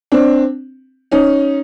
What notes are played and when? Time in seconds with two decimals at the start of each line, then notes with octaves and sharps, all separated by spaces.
0.12 C4 D4
1.12 C#4 D#4